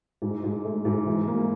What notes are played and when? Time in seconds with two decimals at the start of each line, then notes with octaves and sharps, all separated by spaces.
0.22 G#2
0.44 G#2
0.65 A3
0.85 G#2
1.06 E3
1.28 A#3